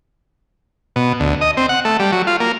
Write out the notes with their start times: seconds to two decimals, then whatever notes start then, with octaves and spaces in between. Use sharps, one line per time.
0.96 B2
1.20 D2
1.41 D#5
1.57 C4
1.69 F#5
1.85 A3
1.99 G3
2.12 F#3
2.27 F4
2.40 A#3